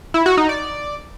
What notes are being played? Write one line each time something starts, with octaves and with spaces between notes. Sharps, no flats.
E4
F#4
D#4
D5